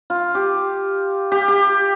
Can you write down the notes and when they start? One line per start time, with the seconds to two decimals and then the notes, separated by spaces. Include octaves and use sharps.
0.10 F4
0.35 G4
1.32 G4
1.48 G4